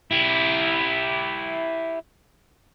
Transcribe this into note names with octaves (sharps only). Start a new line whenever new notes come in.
E4 G4